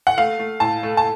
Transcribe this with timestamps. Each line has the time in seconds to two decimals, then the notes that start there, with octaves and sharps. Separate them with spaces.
0.07 F#5
0.17 A3 F5
0.39 A3
0.60 A2 A5
0.83 A3
0.97 A5